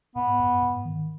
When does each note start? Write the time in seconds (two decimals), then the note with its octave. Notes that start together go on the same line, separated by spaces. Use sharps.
0.16 G#2 B3
0.39 F#2
0.62 G#2
0.85 D#3